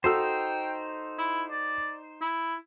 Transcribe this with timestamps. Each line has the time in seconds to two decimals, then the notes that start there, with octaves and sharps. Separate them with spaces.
0.04 D#4 F#4 A4 C5 G5 E6
1.18 E4
1.51 D5
2.21 E4